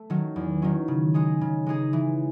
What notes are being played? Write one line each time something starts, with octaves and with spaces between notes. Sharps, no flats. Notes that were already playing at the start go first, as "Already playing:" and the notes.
Already playing: A3
D#3 F#3 C#4
E2
D#3 F#3 C#4
C#3
G#3 D#4 G#4
C#3
G#3 D#4 G#4
E3